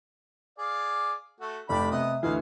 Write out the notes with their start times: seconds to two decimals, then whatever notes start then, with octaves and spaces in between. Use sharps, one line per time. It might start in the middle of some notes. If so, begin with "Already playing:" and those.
0.59 G#4 D5 F5
1.40 A3 F#4
1.69 F1 D4 G4 B5
1.92 C3 B3 D#5
2.23 D2 E3 E4 D#5 F5